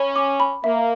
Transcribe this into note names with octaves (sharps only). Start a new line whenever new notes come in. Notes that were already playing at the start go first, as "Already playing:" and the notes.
Already playing: C#4 B5
D6
B5
A#3 E5